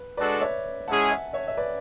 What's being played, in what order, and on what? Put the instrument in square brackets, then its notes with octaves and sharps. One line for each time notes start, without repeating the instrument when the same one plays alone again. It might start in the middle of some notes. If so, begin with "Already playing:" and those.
Already playing: [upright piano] B4
[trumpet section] G#3 D4 F#4 A4 [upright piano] B4 D5
[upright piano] C#5 E5
[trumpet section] G#3 C#4 E4 G#4 [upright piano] F#5 A5
[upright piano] E5 G#5
C#5 E5
E5
B4 D5